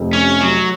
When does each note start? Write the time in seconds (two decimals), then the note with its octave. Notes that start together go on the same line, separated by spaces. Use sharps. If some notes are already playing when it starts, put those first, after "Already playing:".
Already playing: F1 F2 C3
0.13 C#4
0.41 F#3